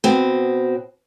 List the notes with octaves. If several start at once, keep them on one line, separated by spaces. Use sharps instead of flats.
B2 C4